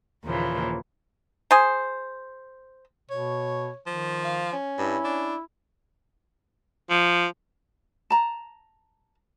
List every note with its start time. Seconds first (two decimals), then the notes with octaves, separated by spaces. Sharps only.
0.25 D#2 A#2 C#3 E3 F3 A#3
1.51 G#4 C5
3.10 B2 C#5
3.86 D#3 F3
4.24 F5
4.53 C#4
4.78 G2 E4
5.04 D4
6.90 F3
8.10 A5 A#5